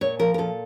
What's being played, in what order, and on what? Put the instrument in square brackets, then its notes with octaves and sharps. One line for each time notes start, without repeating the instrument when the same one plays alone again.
[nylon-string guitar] A#2 C#5
F3 A#4
A#4
A#2 A4